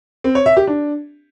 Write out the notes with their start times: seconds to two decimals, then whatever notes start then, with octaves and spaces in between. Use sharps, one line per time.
0.24 C4
0.35 C#5
0.46 E5
0.57 G4
0.67 D4